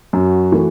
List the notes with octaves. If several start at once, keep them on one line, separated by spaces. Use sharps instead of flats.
F#2 F#4
E3 A3